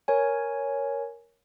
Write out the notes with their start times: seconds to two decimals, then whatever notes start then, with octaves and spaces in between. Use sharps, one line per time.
0.08 A#4 C#5 G#5